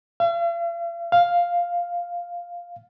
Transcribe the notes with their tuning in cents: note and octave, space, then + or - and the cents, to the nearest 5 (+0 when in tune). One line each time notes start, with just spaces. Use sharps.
F5 -45
F5 +0